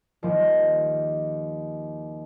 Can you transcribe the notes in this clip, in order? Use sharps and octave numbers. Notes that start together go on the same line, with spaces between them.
D#2 F3